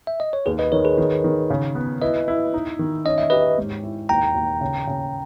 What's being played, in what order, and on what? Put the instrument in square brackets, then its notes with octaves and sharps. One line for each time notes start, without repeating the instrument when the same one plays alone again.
[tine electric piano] E5
D#5
C#5
[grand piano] D#2 [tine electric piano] G#4 B4
[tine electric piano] B4 D#5
[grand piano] D#3 [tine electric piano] A#4 C#5
[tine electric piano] G#4 B4
[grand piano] D#3
D#3
C#3
B3
[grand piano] E4 [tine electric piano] B4 D#5
[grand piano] E4
D#4
D#3
[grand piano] C#4 [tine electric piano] D#5
[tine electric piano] E5
[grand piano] G4 [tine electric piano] B4 D#5
[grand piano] G#2
E4
[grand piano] D#2 [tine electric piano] G5 A#5
[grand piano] D#2
C#3
C#3